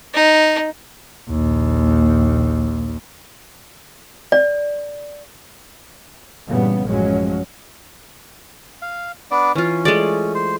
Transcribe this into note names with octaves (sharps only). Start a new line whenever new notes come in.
D#4
A#1 D#2
D5
G2 A#2 C#3 E3 G3 B3
A1 F#2 F3 F#3 G#3 C#4
F5
B3 D4 D5
E3 C#4 F4
G#3 A3 D5
C5